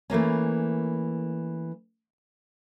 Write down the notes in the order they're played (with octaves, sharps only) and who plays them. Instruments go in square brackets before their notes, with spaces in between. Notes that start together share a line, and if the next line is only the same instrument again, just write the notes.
[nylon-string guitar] E3 A3 A#3 C#4